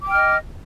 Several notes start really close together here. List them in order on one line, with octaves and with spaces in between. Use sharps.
D6 G5 F6 D#5